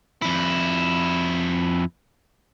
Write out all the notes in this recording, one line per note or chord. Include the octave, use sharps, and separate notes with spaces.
F2 E4